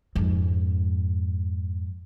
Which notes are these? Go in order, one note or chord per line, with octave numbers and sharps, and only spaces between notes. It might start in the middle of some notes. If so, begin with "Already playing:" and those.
F2 G#2